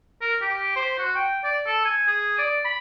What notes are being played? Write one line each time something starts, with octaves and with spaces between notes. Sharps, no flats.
A#4
G4
C5
F#4
G5
D5
A4
G#5
G#4
D5
B5